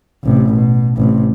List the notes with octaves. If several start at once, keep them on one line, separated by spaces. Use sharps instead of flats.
A1 C3
B2
A1 C3